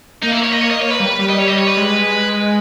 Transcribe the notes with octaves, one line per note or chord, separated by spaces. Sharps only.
A#3 D#4
E4
C#5
D#5
C#5
D#5
C#5
B4
G3
G3
D#5
C#5
D#5
C#5
B4
G#3